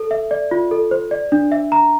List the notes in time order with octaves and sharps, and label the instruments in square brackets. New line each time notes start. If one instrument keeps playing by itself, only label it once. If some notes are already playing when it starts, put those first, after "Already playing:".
Already playing: [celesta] A4
E5
D5
F4
A4
C5
D5
D4
E5
A#5